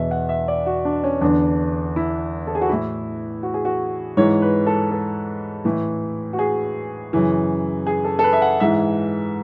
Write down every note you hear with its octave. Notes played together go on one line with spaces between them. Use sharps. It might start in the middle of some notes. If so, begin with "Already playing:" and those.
Already playing: E2 B2 E5
F#5
E5
D5
F#4
D4
C#4
E2 D3 D4
E4
A4
G#4
F#4
A2 E3 E4
F#4
G#4
F#4
G#2 E3 C#5
B4
A4
A4
A2 E3
F#4
G#4
F#2 C#3 E3
G#4
A4
A4
B4
E5
F#5
G#2 E3 E5